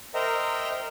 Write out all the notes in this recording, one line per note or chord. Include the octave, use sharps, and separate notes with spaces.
A#4 C5 D#5 E5 G5 A#5